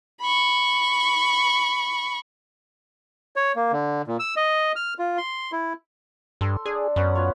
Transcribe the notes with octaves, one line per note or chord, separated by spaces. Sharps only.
B5 C#6
C#5
A#3
D3
A#2
E6
D#5
F6
F4
C6
E4
G2 A4 C6
D4 G#4
F#2 B3 C#4 F#5
B3 F4 C#5